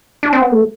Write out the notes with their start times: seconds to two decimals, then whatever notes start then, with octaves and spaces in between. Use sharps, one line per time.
0.23 D4
0.33 C4
0.42 B3
0.52 A3